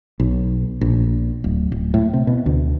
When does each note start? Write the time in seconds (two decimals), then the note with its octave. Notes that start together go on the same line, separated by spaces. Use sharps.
0.20 B1
0.81 A#1
1.44 D1
1.72 D1
1.94 A2
2.13 C3
2.27 B2
2.46 D2